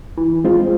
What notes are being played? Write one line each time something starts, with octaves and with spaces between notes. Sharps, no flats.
E3
G#3 C4 F4